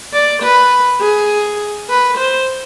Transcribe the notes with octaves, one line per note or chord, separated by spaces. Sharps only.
D5
B4
G#4
B4
C5